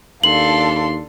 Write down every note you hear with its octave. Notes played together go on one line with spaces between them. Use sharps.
D#2 D4 A4 F5 C6 F#7